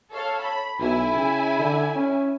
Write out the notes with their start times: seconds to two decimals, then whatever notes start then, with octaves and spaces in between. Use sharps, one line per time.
0.11 A4 C#5 F5
0.42 B5
0.79 B1 E4 G#5
1.15 C#3
1.59 D3
1.95 C#4